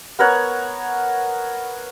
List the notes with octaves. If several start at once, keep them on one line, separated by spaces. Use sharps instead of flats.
B3 A#4 C#5 F#5